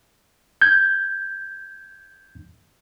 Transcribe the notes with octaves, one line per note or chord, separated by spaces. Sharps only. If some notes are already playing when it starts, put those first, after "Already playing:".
G6 G#6